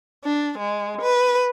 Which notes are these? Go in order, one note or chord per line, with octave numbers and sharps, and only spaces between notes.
D4
G#3
B4